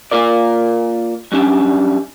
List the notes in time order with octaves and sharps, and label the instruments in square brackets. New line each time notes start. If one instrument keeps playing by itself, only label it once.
[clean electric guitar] A#3 F4 A#4 D5
F#3 G3 C#4 D4